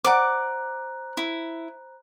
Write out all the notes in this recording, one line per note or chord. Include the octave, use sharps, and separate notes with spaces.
C5 D5 F#5 A#5 D6 F#6
E4